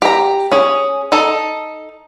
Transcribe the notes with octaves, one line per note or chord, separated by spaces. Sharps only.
G4 A#5
C#4 G#4
D#4 A4